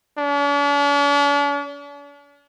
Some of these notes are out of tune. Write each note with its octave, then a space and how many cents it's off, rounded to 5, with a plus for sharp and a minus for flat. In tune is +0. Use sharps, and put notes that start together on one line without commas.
D4 -45